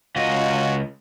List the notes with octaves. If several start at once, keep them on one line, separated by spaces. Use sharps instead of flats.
C#2 F4 F#4 D#5